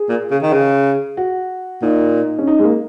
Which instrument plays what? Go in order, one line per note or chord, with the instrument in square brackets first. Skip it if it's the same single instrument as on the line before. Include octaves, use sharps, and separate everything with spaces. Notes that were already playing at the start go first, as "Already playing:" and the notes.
Already playing: [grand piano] G#4
[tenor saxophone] A#2
C#3
D#3
C#3
[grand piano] F#4
[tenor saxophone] A#2 [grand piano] D#4
[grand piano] C#4
D#4
G#3
A#3